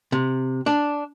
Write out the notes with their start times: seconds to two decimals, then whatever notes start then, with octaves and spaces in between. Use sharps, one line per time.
0.12 C3
0.66 D4